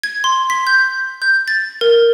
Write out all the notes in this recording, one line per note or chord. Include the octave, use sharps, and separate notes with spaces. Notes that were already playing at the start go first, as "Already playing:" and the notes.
G#6
C6
B6
G6
G6
A6
A#4